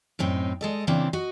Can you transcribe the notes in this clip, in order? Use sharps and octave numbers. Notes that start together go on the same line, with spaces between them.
F#2 A2 C4 D#4
G#3 A4 D#5
C#3 E3 A#3 C4 D4
F#4 D#5